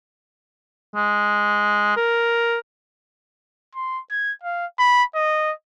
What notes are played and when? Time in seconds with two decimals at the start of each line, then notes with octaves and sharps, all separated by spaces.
0.96 G#3
1.97 A#4
3.75 C6
4.11 G#6
4.43 F5
4.79 B5
5.15 D#5